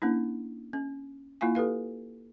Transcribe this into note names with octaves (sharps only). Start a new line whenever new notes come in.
A#3 C#4 D4 E4
C#4
A#3 E4 F4 F5 G#5
G4 A4 B4 F5